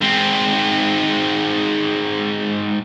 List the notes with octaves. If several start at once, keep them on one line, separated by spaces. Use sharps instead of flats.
G#2 C4